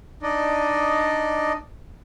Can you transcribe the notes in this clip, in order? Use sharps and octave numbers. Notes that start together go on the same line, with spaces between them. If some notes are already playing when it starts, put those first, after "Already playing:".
D4 D#4 D5 D#5